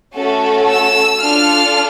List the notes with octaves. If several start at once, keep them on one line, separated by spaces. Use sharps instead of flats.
A3 C#4 F#4 A4
E6
D4 F4 A4 F6